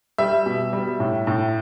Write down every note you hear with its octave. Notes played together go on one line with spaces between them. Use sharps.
G3 E5
B2
G3
A2
A2